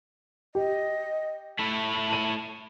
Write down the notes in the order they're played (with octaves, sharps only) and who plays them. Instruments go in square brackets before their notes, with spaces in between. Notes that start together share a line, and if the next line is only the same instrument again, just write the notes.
[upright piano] G4 [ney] D#5
[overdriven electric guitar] A3 E4 [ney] A5
[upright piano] D#7